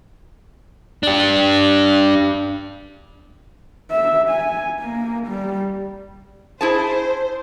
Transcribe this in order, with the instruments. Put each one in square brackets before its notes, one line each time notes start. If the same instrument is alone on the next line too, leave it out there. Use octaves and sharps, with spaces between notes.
[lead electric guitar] D4 G4
[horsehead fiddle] E5
G#5
A#3
G3
[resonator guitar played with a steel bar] E4 G#4 A5 [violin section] C5